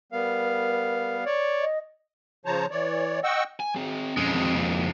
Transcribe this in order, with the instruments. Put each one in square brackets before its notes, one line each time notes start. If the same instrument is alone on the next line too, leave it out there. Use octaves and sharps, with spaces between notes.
[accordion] G3 B3 F5 [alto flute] A#4
[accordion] C#5 D5
[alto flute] D#5
[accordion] C#3 F3 C5 C#5 A5 A#5
E3 C#5 D5
D#5 F#5 G5 C#6 E6
[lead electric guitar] G#5
C4 G#4
[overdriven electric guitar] F2 G#3 [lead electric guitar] C#4
[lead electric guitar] D#3 C4
C#3 A#3